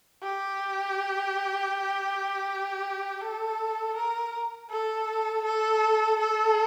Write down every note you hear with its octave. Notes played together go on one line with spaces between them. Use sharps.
G4
A4
A#4
A4
A4
A4